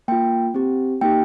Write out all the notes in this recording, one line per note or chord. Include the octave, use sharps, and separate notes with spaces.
A#3 F4 G5
C4 G4
A#3 D#4 G4 G5